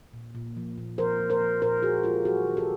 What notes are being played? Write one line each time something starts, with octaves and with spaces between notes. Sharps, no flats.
A#2
A#2
F3
A#2
F3 A#4 C5
F3
A#4 C5
F3
A#2 A#4 C5
A#2 F#4 G#4
G#3 F4 G4
F#3 F#4 G#4
D#3
G4 A4